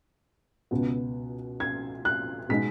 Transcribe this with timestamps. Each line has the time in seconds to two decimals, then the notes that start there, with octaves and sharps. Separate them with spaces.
0.71 C#2 B2 B3
1.60 G#6
2.05 F#6
2.49 B2 G#3 B3 D#4 B6